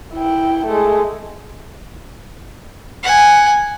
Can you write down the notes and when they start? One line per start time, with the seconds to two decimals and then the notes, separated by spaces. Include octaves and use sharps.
0.14 E4 G5
0.67 G#3 A3
3.03 F#5 G#5